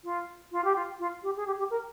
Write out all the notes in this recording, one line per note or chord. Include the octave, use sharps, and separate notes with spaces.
F4
F4
G4
F4
F4
G4
G#4
G4
G4
A#4